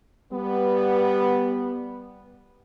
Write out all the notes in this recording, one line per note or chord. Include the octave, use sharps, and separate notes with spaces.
G3 B3